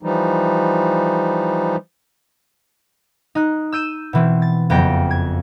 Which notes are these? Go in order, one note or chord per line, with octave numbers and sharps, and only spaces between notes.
E3 F3 G3 D#4
D#4 F#6
E6 G6 D#7 E7
B2 E3 C4
A6
F#1 F2 B3 G5 A#6
G#6